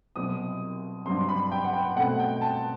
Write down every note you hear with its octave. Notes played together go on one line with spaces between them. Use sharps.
C2 B2 F#3 C4 D#6
G2 F#3 C4 C6
B5
G5
F#5
G5
B2 A3 C4 F#5
G5
A5